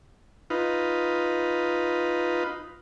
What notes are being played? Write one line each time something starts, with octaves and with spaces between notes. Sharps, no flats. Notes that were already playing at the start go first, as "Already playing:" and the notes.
D#4 F4 B4